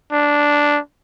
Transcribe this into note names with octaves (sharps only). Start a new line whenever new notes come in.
D4